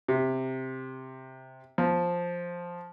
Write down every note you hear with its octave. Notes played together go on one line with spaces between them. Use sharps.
C3
F3